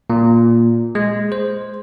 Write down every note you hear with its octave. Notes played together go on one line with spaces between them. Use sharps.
A#2
G#3
C5